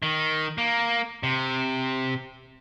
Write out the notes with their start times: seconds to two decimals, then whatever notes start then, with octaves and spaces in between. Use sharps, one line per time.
0.03 D#3
0.58 A#3
1.23 C3